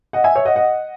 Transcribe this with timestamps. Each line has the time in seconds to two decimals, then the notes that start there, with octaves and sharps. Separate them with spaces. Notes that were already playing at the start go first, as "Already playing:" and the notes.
0.13 D#5 F#5
0.24 E5 G#5
0.35 C#5 E5
0.45 D#5 F#5
0.56 D#5 F#5